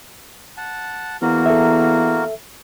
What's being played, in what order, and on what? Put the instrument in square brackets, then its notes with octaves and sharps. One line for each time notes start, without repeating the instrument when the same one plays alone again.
[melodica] F#5 A5
[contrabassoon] E2 [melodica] A#3 F#4 A#4
[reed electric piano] A4 E5